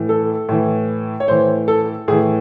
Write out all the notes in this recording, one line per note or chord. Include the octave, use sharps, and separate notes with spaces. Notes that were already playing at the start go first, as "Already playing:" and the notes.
Already playing: A2 E3
A4
A2 E3
C#5
A2 E3 C5
A4
A2 E3 G#4